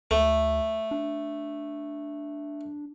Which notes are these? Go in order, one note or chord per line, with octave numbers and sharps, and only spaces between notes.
D2 A3
D4